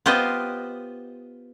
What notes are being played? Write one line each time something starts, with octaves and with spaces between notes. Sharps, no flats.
B3 F4 G4 C5 D#5